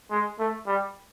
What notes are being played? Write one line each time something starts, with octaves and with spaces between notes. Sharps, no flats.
G#3
A3
G3